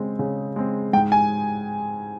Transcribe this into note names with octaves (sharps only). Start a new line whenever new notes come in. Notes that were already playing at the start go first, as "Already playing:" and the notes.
Already playing: C#3 G#3 C4
C#3
G#3 C4
G#2 G5
G#5